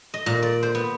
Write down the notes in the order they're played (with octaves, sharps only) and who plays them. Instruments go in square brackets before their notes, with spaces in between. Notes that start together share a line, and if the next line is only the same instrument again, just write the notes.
[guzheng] D#5
A#2
D5
C5
B3